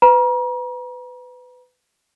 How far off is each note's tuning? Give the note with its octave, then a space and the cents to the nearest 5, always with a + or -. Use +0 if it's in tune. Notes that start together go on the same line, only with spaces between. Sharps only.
B4 +25 A#5 +40